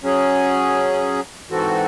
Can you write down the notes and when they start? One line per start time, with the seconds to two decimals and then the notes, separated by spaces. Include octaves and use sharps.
0.03 F#3 C#4 G#4
1.50 G#2 E3 C4 F#4 A4